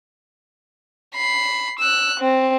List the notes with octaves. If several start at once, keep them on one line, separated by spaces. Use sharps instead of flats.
B5 C7
E6 F#6
C4